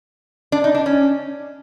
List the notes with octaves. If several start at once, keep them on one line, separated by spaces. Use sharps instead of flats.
D4
D#4
D4
C#4